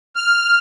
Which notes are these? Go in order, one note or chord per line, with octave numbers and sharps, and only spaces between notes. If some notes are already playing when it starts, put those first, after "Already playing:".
F6